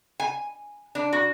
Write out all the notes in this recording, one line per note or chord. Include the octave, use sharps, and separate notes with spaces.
G#5
D4
F#4